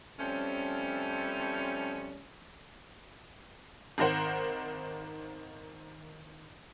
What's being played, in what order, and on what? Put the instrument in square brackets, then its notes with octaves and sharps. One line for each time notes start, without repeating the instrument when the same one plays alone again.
[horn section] F3 G3 A3 C4 C#4
[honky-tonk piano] G#1 D#3 A#4 C5 F#5